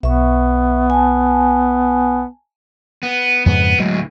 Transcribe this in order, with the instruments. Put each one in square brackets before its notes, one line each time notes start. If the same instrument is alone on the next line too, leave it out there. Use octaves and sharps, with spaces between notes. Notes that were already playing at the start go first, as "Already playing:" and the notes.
[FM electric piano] B1 [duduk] B3 [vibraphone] E5 C#6
[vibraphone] G#5 A5
[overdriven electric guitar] B3
[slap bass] F2 G#2 C#3 [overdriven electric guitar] B3
[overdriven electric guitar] D2 A2 [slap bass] F#3 G#3